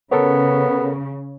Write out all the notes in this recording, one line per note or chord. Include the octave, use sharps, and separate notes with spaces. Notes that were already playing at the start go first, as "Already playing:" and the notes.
C#3 B3 A4 A#4 C#5